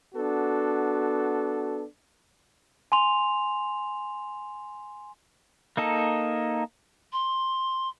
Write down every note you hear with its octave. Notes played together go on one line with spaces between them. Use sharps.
B3 D4 F#4 A4
G#5 C6 F7
A#3 D#4 A4
C6